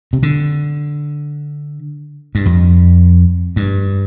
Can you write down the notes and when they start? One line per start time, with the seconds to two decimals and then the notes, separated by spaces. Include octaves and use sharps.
0.13 C3
0.23 D3
2.35 G2
2.46 F2
3.56 G2